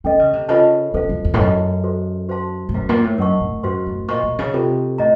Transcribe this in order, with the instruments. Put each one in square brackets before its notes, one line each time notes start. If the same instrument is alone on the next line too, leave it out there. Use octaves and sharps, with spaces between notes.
[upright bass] D#3 [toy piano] C#4 A4 D#5
[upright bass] C#3
C3
[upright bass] C#3 [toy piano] F4 A4 C5 D#5 A5
[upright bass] C#3 [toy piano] A4 C5 F5
[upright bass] F#2
F2
A2
[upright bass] F#2 [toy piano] A4 D#5 A5
[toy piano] F#4 A4 C5
F#4 C5 F5 A5 C6
[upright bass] A2
[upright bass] F#2 [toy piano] C5 F5 A#5
[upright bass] A#2
A2
[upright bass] F#2 [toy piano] A#4 D#5 F#5 A5 C#6
[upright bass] A2
[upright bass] F#2 [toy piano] F#4 C5 F5 C6
[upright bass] A2
[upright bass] A#2 [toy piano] C5 D#5 A#5 C#6
[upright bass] A#2
C#3
[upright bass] C3 [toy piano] F4 A4 C5
[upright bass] A2 [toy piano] D#5 A#5